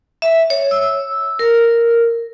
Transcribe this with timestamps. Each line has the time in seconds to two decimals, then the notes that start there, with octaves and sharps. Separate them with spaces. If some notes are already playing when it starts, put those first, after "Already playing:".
0.22 E5
0.50 C#5
0.71 E6
1.39 A#4